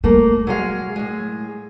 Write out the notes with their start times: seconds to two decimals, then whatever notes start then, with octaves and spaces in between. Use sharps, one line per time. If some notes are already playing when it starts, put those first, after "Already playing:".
0.04 G3 A3 A#3
0.47 F#3 G#3 F5
0.96 A2 G#3